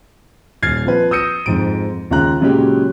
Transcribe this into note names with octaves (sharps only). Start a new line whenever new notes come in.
D#1 F6 G#6 A6 C7
F3 C4 B4
D#6 E6 G6 A#6 C#7 D#7
F2 G#2 D7
D#2 C#3 G#3 F4 A#5 F#6
A#2 C#3 F#3 G#3 C#4 G4